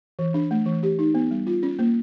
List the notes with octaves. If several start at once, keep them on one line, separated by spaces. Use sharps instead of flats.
E3
D4
A3
E3
G4
D#4
B3
G3
F4
C#4
A#3